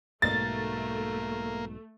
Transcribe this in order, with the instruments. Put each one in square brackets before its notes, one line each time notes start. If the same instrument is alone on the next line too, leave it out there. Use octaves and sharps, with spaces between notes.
[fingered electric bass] B1 G#2 B2 [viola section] A3 [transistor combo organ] A#3 [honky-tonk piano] A6